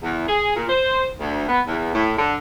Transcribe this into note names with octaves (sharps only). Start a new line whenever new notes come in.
E2
G#4
A#2
C5
D2
B3
E2
A2
D3